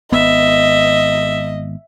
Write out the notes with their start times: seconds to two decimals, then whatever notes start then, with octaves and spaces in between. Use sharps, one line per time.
0.12 G#1 B3 D#5 E5